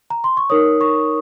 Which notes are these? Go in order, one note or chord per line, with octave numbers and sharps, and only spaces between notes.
A#5
C6
C#6
D#4 A#4 C#5 D#6
C#6